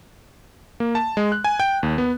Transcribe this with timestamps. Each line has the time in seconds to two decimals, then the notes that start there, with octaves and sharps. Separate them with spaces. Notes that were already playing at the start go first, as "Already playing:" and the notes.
0.80 A#3
0.95 A5
1.17 G#3
1.32 F#6
1.44 G#5
1.60 G5
1.83 D#2
1.98 B3